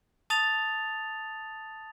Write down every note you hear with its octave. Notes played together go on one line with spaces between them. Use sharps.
A5 D#6 A6 F7